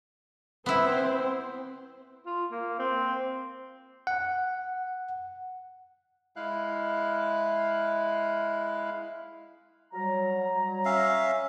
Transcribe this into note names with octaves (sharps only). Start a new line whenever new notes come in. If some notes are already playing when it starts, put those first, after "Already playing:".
B3 C4 E4 C5
F4
A#3
C4
F#5
G#3 E4 F5 F#6
F#3 G3 A#5
C#4 E5 F5